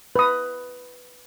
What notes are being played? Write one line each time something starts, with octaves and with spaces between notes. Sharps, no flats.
B4 D#6